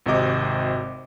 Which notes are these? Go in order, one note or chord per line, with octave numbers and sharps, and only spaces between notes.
G#1 C3 F#4 D#5 D6